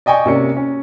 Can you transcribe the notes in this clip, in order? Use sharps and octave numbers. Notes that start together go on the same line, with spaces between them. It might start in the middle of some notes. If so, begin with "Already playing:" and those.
D5 D#5 G5 G#5 C#6
C3 A#3 C#4 D5 C#7
C#4